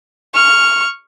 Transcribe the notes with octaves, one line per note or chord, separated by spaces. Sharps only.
C#6 F6